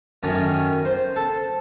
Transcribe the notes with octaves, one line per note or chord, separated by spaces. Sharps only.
F#2 D#3 A3 C#4
C5
A4